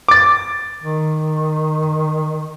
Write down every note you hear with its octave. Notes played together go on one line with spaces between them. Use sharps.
D6 A6
D#3